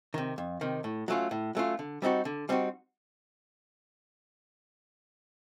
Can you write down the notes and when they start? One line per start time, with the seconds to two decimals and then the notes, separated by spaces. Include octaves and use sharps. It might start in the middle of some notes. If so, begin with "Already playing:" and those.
0.14 C3 D#3
0.38 F2
0.61 C3 D#3
0.84 A2
1.08 F#3 A3 C#4 F4
1.31 A2
1.55 F#3 A3 C#4 F4
1.79 D3
2.02 G3 C4 D#4 F#4
2.25 D3
2.49 G3 C4 D#4 F#4